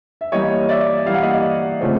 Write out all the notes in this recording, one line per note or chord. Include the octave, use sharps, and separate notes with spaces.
E5
E3 G3 A#3 C#5 D#5
D5 E5
E3 G3 A#3 F5
F#5
D#5 F5
C#3 F3 A3 C4